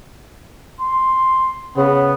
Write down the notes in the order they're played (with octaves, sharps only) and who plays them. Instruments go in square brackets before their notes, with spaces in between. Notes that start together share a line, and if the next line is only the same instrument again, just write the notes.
[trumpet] C6
[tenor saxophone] C#3 [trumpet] B3